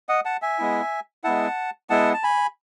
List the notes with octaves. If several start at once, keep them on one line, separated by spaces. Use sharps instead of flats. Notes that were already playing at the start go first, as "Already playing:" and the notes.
D#5 F#5
F#5 A5
E5 G#5
G#3 B3 E4
G#3 B3 E4 F#5 A5
G#3 B3 E4 F#5 A5
A5
G#5 B5